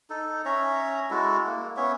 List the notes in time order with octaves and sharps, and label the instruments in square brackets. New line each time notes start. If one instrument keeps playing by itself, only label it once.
[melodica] D#4 A4
C#4 C#5 E5 A#5
G#3 E4 F#4 A4
A#3
B3 C#4 C#5 E5